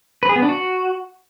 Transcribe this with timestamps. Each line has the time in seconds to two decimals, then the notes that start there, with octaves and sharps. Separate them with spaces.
0.23 B4
0.29 G#4
0.36 B3
0.42 D4
0.49 F#4